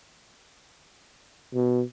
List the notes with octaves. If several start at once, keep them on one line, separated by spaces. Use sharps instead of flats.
B2